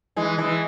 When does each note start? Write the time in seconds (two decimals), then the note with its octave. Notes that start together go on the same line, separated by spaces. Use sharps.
0.16 E3 G#3
0.38 E3 G#3